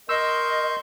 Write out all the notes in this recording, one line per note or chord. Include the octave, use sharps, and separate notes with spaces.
A#4 D#5 C6 C#6 E6 G6